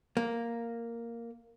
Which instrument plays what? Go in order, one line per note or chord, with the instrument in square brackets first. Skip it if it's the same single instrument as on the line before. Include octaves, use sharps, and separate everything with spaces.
[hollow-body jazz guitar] A#3